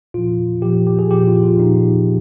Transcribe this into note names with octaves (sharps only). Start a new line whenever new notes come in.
A#2 F3 F4
A#2 F3 G4
G4
G#4
A#2 F3 G4
F4
F4
A#2 F3 D#4